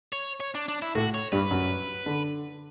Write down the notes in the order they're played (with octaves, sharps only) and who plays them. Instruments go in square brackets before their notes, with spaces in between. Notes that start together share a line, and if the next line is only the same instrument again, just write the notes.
[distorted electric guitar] C#5
C#5
D4
D4
E4
[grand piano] A2 A3 [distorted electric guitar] F#4
[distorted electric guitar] C#5
[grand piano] G2 G3 [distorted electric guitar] B4
[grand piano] F#2 F#3
D3